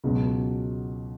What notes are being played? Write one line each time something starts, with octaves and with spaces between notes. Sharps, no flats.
C#2 B2 F#3